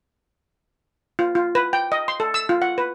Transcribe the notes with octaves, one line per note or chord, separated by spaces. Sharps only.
F4
F4
B4
G5
D#5
C6
A4
E6
F4
F#5
B4